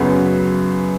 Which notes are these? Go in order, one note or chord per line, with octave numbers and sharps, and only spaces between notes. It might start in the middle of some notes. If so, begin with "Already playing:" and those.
Already playing: F#2 C#3 F#3 B3